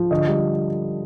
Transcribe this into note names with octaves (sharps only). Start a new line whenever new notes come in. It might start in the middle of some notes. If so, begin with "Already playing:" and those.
Already playing: F3
D3 D#5
G3